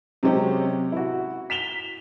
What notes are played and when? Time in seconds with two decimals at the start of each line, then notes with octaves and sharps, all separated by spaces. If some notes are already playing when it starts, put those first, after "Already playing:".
0.23 C3 F#3 G#3 C4 C#4 G4
0.92 E4 F#4
1.50 B6 E7 F7 G7